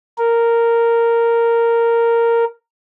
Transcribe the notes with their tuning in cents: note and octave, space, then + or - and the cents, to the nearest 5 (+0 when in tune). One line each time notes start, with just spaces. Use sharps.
A#4 -5